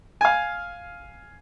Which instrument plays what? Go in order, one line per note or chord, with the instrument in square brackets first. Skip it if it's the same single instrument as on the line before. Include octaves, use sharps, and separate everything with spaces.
[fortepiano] F5 G#5